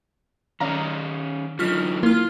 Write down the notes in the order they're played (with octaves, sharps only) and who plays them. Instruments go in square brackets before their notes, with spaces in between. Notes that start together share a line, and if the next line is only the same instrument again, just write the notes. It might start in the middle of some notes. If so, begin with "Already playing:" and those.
[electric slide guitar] D#3 C#4 D#4 [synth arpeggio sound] D5 F5 A#5
[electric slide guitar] D3 F#3 D#4 [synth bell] F4 F6 B6
[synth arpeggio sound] A#3 [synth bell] E4 F6 [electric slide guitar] F4